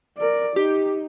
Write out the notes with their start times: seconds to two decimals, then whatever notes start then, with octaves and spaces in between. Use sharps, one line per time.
0.18 A#4 D5
0.56 D#4 G4